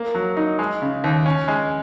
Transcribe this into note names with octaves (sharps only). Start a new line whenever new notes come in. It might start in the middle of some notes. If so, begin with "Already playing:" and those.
Already playing: A#3
F#3
D#4
G#3
C#3
D#2
C#4
G#3